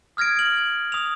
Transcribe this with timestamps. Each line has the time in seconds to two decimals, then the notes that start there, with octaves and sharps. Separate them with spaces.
0.17 D#6 F6 G#6 A#6 D7
0.37 D7 F#7
0.92 D#6 F7